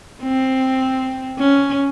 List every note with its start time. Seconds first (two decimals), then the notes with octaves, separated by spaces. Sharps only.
0.22 C4
1.39 C#4